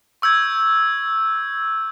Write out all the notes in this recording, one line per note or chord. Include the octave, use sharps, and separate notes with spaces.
C#6 E6 G6 G#6